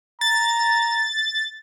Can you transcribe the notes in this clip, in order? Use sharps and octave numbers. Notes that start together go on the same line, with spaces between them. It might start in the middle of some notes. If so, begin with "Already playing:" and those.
A#5 A6